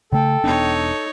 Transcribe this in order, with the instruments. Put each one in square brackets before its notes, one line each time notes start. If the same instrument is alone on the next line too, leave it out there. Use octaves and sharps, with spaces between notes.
[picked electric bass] C#3 A3 [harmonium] A4 [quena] G5
[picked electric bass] E1 B3 D4 [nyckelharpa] D#4 C#5